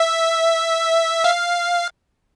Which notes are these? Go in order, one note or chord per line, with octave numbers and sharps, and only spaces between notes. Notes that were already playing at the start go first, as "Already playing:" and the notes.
Already playing: E5
F5